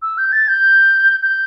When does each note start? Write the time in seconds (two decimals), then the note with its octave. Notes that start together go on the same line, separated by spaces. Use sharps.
0.02 E6
0.18 G6
0.32 A6
0.48 G6
1.22 G6